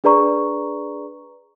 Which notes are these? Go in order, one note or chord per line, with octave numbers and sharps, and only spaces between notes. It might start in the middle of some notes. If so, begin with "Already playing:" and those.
D4 G#4 B4 D5 A#5 C#6